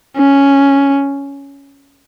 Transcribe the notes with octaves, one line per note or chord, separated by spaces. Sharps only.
C#4